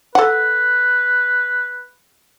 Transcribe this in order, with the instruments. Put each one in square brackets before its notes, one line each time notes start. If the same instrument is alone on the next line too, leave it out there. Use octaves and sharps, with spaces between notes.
[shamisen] A4 F#5 [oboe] B4